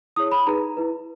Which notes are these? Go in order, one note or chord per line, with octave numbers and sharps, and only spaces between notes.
E4 G#4 C#5 D#6
B5
D#4 G#4 B4 A#5
E4 B4